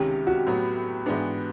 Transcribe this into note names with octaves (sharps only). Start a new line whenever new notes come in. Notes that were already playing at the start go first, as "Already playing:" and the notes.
Already playing: C#2 C3 D#3 G#3 C#4 G4
F#4
A2 F#3 B3
G#2 E3 G#3 B3 D4